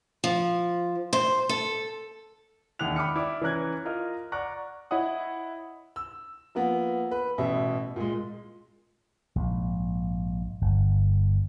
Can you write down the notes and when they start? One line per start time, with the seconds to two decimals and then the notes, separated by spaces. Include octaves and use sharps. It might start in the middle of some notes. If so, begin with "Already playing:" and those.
0.24 F3
1.13 C5
1.49 A4
2.79 E1 D#2 E4 F#5 F#6 F7
2.96 G5 B5 D6 D#6 F6 C#7
3.16 E4 D5 D6
3.42 E3 C#4 A#5 F#6 G#6
3.85 F4 A#4 D#5 F6
4.32 D5 F#5 A#5 C#6 F#6
4.91 E4 C#5 D#5 F#5 D#6
5.96 E6
6.55 F3 A#3 B3
7.11 B4
7.38 A1 B2 E5
7.96 A#2 G#3
9.36 A#1 G#2
10.61 G1